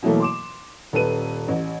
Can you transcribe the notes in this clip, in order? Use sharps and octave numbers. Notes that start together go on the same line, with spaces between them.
B2 E3 F#3 A3 A#3
C6 D6 E7
D#1 A4 B4 D#7
A1